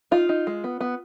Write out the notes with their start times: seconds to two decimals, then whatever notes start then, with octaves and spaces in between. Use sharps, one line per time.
0.11 D#4 F4
0.29 D#4
0.47 G#3
0.64 B3
0.80 B3